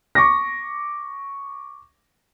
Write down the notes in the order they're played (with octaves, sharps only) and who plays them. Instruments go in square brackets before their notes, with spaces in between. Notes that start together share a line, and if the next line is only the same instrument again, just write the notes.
[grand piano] C#6 D6 A#6